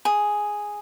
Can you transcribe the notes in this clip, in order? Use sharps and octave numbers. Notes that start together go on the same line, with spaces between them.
G#4